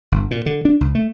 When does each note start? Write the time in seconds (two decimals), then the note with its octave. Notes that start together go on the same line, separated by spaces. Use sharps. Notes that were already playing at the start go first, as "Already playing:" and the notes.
0.12 G1
0.31 A#2
0.46 D3
0.65 D4
0.81 C#2
0.95 A3